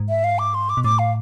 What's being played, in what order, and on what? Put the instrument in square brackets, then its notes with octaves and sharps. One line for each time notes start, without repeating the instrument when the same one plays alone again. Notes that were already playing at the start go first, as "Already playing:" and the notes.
Already playing: [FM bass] G#2
[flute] E5
F5
D6
C6
D6
[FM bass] B2
[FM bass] A2 [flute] D6
[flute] F5